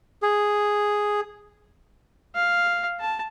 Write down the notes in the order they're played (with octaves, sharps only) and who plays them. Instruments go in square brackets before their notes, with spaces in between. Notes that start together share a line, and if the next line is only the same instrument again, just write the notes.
[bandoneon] G#4
[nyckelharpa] F5
A5